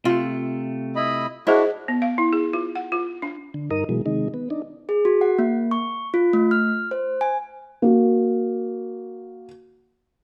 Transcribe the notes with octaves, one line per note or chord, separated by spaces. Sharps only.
C3 A3 F4
E4 D#5 B5
D4 E4 F#4 G#4 C5 D#5
B3
F5
E4
G#4
F4
F#5
F4
D4
D3
G2 D#4 A#4 D#6
B2 E3 F#3 G#3
C3 D#3 G#3 D#4
B3
D4 D#4
G#4
F#4
F#5
A#3
C#6
F4
A3
F6
C5
G#5
A#3 F#4